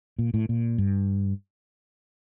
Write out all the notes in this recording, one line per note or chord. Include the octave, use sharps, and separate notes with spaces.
A#2
A2
A#2
G2